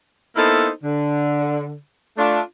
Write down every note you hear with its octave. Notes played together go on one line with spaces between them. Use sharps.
A#3 B3 D#4 E4 A4 C5
D3
A3 D4 F4